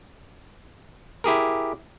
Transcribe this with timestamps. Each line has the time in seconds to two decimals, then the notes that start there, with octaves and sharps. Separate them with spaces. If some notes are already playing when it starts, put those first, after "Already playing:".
1.24 E4 G4 G#4 A#4